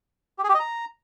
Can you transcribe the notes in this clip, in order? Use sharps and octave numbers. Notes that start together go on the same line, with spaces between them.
G4
G#4
G4
D#5
A#5